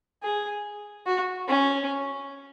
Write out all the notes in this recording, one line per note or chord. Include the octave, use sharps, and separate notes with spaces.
G#4
F#4
C#4